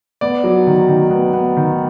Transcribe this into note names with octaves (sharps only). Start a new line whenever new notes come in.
B3 D5
F#3
D#3
D#3
B3
B3
D#3